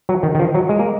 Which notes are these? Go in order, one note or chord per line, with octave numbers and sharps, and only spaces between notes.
F#3
D#3
D#3
F3
F#3
G#3
A#3